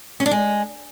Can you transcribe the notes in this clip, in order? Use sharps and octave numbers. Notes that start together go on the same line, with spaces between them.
C#4
D4
G#3